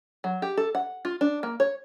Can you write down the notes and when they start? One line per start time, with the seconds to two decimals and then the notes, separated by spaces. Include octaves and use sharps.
0.24 F#3
0.42 G4
0.57 A4
0.75 F#5
1.05 F4
1.21 D4
1.43 A#3
1.60 C#5